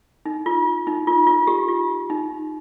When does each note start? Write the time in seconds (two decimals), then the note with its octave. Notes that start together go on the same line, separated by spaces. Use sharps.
0.26 D#4
0.46 F4
0.87 D#4
1.07 F4
1.27 F4
1.47 G4
1.68 F4
2.10 D#4